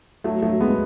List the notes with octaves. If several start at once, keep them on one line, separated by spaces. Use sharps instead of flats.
F#3 A3
F#3 A3
G#3 B3